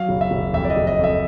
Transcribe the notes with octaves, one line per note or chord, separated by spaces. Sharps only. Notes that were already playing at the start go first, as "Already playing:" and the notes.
Already playing: F#3 F5
F#1
E5
F#1
F2 E5
D5
D#5
F#1
D#5
F2 E5